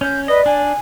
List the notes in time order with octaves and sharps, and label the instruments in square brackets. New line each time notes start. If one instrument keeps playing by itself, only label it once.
[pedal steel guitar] C#4 [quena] G6
[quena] B4 [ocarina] D5 [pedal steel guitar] D#5
[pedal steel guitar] D4 [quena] G#5